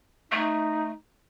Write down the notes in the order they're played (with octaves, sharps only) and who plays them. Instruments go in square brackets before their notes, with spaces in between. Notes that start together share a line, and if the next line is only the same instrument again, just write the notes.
[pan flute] A3 [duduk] D#4